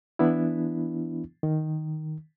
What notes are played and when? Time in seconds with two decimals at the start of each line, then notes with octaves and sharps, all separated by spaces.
0.19 E3 B3 D4 E4
1.43 D#3